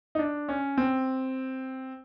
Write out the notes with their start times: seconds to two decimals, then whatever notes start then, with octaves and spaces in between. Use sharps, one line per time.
0.15 D#4
0.19 D4
0.49 C#4
0.77 C4